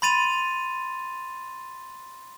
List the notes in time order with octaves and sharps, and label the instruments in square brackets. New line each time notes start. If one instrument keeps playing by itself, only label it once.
[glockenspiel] B5 C6 A6 D#7 F7